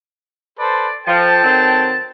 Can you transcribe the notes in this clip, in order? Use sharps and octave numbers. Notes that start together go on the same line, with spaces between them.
A4 B4 C5 D5
F3 A4 G5 A5
D#3 F#3 C4